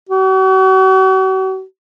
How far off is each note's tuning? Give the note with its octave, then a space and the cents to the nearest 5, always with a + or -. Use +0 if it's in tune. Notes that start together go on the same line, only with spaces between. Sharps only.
F#4 +40